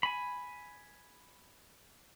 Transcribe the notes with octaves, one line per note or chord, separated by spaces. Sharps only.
G#5 B5